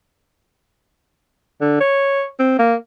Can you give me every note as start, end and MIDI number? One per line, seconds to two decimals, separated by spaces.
1.61 1.79 50
1.80 2.25 73
2.39 2.58 60
2.59 2.75 58